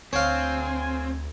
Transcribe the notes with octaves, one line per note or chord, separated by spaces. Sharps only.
D2 C4 C#5 F5 G#5